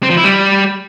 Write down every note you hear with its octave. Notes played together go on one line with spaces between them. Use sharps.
C4
F3
E4
G3